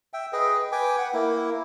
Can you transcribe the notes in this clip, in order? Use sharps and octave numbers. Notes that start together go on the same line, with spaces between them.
E5 G5
G#4 B4 D#5 G5
B4 G5 G#5 D6
F#5
A#3 E4